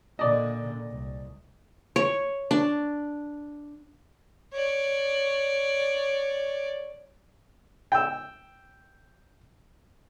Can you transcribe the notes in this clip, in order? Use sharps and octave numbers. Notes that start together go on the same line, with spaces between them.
A#2 D3 D5 D#5
C2
C#5
D4
C#5 D5
G5 E6